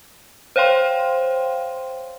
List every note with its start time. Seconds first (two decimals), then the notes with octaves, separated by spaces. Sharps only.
0.56 C5 C#5 F5 G5 C6